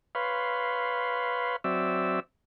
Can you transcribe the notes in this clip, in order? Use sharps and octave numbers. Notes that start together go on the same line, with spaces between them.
B4 C#5 F5 B5 C6
F#3 C4 D5 E5 E6